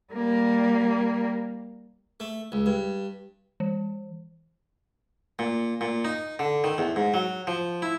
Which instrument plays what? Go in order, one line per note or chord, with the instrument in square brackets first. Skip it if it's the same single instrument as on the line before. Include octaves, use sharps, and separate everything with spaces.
[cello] G3 A#3
[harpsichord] A3
C#2
G2
[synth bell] E3
[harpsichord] A#2
A#2
D#4
D3
D#3
E2
G#2
F#3
F3
E4